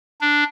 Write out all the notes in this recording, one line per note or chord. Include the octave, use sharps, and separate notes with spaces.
D4